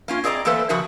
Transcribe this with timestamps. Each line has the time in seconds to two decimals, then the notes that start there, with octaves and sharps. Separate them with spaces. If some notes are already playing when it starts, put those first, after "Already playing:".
0.08 A#3 C#4 F4
0.24 C4 G#4 D5 D#5 A#5
0.45 E3 A3 A#3 A4 B4 C5
0.69 C#3 F3 F#4 A#4 E5